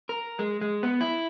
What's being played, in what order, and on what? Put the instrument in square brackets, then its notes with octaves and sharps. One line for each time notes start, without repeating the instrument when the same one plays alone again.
[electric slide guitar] A#4
G#3
G#3
B3
E4